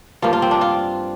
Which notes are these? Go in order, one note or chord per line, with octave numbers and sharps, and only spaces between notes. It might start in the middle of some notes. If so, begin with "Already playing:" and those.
G2 F3 A#3 F4
F4
C4
D4
F4